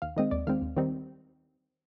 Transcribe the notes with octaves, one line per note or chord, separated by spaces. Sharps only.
D#2 F5
D#3 G#3 C4 D#5
D#2 D5
D#3 G#3 C4 F5
D#2
D#3 G3 C4 D#4